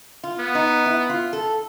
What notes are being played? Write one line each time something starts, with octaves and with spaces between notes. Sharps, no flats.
F4
B3
D#4
E4
F4
A4